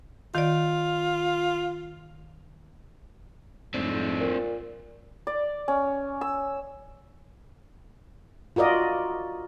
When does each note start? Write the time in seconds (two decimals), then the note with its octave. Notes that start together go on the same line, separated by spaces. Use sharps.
0.35 D#3 F4 D5
3.74 F2 G#2 A3 C4 D4
4.20 A#2
5.27 D5
5.68 C#4
6.21 E6
8.56 F4 F#4 A#4 D5 D#5